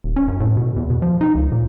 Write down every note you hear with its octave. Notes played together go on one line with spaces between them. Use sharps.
D#1
C#4
F#2
A2
B2
E2
B2
F3
D#4
C#2
A#2